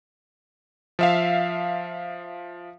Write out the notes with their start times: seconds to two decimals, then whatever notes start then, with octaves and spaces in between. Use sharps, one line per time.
0.99 F3 E5 F5